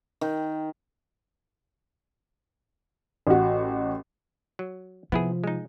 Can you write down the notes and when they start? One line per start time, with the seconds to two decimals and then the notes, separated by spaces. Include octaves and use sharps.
0.21 D#3
3.27 A1 F#4
4.59 F#3
5.12 C3 F3 B3 E4 G#4
5.44 G#3 D#4